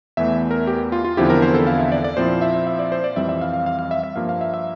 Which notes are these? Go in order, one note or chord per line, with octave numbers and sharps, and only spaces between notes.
E2 E3 A3 E5
A#4
G4
F4
F4
E2 D3 F3 C4 E4 G4
A#4
C5
A4
F5
E5
D5
D5
A#2 F3 C4 E4 C5
E5
E5
D5
C5
D5
F2 E3 G3 C4 E5
E5
F5
F5
F5
F5
E5
E5
G2 F3 A#3 F5
F5
E5
E5